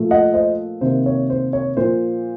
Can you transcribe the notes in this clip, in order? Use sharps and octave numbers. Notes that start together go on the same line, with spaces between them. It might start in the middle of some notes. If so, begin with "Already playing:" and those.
Already playing: A#2 F3 A3
D#5 F#5
C5 D#5
C3 D#3 A#3 C5
C#5
C5
C#5
A#2 F3 A#3 C5